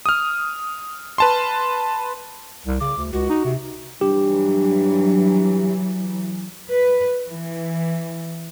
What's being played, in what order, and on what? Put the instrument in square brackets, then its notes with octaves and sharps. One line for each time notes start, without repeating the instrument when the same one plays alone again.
[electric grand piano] D#6 F6
B4 A5 C6
[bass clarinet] C2
[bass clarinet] C#3 [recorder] D6
[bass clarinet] D2
[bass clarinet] C#2 [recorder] F#4
[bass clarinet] D#4
C3
[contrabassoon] G2 [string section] E3 F#3 [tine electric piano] G4
[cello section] B4
E3